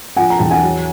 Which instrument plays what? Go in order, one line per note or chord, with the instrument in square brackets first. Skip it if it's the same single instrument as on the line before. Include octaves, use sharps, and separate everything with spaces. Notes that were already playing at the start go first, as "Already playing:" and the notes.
[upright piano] F3 F#5 G#5
A#5
E2 G5 A5
F#5 G#5
F#3